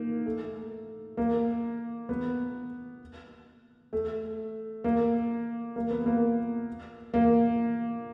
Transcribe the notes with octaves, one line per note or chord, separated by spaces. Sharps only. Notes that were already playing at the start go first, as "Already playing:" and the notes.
Already playing: A#3 D#4
A3
A#3
B3
A3
A#3
A#3
B3
A#3
A#3